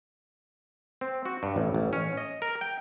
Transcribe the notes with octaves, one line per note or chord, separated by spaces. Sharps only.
C4
F#4
G2
A1
A1
C#4
D#5
A#4
G5